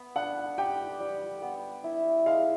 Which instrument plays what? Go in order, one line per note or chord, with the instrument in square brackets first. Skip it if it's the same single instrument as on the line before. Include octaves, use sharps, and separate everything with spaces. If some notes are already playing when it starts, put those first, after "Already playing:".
Already playing: [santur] B3
[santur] D4 [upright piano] F#5
[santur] G4 [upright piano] G5
[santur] G3
B3
E4
[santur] G#3 [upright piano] F5